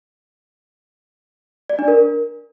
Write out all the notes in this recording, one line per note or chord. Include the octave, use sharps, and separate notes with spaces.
D5
D4
A#4